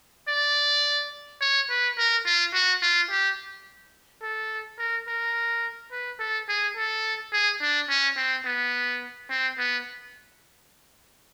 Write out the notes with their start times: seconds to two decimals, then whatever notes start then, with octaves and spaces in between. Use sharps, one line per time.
0.28 D5
1.41 C#5
1.70 B4
1.97 A#4
2.25 F4
2.54 F#4
2.82 F4
3.10 G4
4.23 A4
4.78 A#4
5.08 A#4
5.92 B4
6.20 A4
6.49 G#4
6.76 A4
7.32 G#4
7.61 D4
7.89 C#4
8.17 C4
8.45 B3
9.30 C4
9.58 B3